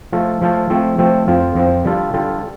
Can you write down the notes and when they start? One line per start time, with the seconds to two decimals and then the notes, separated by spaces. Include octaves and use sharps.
0.12 F3 A3 F4 A4
0.41 F3 A3 F4 A4
0.70 F3 A3 C4 A4
0.99 F3 A3 C4 A4
1.28 F2 F3 C4 F4
1.55 F2 F3 C4 F4
1.85 D3 G3 F4 A4
2.13 D3 G3 F4 A4